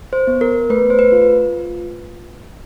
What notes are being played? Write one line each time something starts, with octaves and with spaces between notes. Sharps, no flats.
C5
B3
A#4
A3 B4
C5
B4
F4